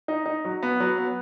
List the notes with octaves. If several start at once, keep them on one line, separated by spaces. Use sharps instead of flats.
D#4
D#4
F#3
B3
F#3
B3